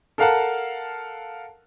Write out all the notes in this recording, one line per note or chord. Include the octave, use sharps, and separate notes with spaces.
A4 A#4 F5 F#5 A5